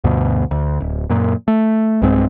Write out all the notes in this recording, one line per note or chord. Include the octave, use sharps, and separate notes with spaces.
D2 G2 B2
D2
D1
F#2 A#2
A3
B1 G2 G#3 C4